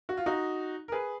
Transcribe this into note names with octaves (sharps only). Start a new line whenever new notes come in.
F#4
F4
D#4 F#4
A#4
G#4 B4